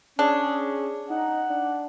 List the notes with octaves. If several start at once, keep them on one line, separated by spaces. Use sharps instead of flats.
C#4 D4 G#4
D#4 F#5
D4